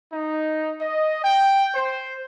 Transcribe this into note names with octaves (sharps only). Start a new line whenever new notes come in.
D#4
D#5
G5
C5